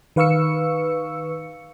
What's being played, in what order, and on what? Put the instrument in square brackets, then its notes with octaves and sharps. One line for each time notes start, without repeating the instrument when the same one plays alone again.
[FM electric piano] D#3 B4 F5 C#6 E6 C#7